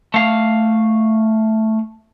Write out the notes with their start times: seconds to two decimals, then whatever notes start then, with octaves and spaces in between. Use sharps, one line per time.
0.14 A3 F5